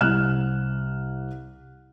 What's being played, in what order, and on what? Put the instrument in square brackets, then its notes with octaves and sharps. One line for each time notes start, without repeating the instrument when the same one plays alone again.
[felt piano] C2 F6 F#6 E7